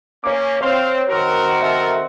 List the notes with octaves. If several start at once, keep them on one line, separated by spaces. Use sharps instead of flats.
A#3 C#4 C#5 D6
C4 C5 C#5 F5
D#3 C4 F#4 A#4
A4 A#4 E5